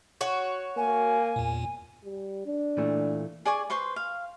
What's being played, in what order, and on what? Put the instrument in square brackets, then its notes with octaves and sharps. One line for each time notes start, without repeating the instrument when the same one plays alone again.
[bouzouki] F#4 C#5
[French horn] A#3 [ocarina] G#5
[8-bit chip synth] E2 A#2
[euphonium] G3
D4
[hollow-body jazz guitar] A#2 E3 A3
[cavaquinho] G#4 D5 G#5 C#6
B4 C5 C6 C#6
F5